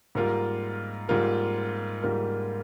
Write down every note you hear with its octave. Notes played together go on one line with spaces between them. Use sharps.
G#2 G3 A#3 F4 A#4
G#2 G3 A#3 F4 A#4
G#2 G3 A#3 F4 A#4